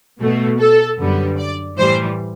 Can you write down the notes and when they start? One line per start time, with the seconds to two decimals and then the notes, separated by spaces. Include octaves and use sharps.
0.21 B2 A3
0.60 A4
0.99 F#2 D3 G3 B3
1.38 D5
1.78 A2 E3 G3 C5